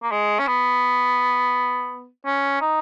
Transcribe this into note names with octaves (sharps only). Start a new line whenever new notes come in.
A#3
G#3
C#4
B3
C#4
D#4